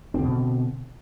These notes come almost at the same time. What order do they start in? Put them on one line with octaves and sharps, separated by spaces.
C4 D3 B2